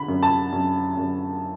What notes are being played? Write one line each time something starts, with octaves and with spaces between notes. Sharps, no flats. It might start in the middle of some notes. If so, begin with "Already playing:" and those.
Already playing: D3 B5
F#2
A5
F#2
F#2